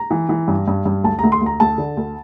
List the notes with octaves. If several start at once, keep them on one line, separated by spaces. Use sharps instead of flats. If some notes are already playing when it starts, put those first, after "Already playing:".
Already playing: A#5
E3
E3
G2
G2
G2
D2 A5
D2 A#5
C6
D2
A#5
D2 A5
D3
D2